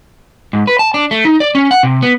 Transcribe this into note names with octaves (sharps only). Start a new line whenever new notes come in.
G#2
B4
A5
D4
A3
D#4
D5
C#4
F#5
C3
B3